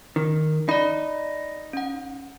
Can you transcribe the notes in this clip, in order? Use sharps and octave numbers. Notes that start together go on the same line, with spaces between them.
D#3
D#4 D5 B5
C#4 F#5